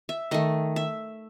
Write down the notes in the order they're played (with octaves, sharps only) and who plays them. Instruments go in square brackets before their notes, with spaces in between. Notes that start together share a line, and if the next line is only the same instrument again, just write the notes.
[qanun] E5
D#3 A3 D#5
E5